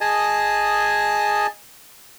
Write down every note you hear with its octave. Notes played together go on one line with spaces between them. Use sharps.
G#4 D#5 G#5 A5